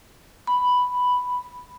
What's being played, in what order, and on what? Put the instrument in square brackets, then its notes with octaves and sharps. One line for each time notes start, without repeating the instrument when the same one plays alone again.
[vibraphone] B5